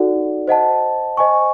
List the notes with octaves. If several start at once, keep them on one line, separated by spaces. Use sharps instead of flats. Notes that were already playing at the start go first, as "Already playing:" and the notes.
Already playing: D#4 F#4 A4 D5 F#5
C5 D#5 F#5 A5
C5 D#5 G#5 C#6